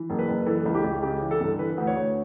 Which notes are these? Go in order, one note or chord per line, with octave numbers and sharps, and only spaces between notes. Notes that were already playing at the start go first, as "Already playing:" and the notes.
Already playing: E3
F#1
B4
F#1
E3 A4
C#2
G4
C#2
C#3 G4
E3
A4
G1
E3 B4
D2
C#5
D2